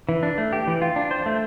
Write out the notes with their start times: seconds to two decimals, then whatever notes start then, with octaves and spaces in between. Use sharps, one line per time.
0.09 E3
0.23 D4
0.38 A3
0.53 G4
0.67 E3
0.82 F4
0.96 D4
1.11 C5
1.26 A3